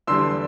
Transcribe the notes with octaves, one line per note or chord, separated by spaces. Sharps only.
E2 D3 G3 C6 E6